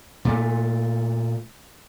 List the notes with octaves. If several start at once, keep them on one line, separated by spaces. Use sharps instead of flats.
A#2 A3